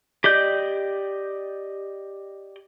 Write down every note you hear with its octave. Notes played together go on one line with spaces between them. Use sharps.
G4 D5 D#5 G6